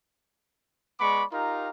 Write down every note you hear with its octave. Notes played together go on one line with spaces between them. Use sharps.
G#3 B3 D5 B5 C#6 D6
D#4 F4 G4 A#4 F5 A#5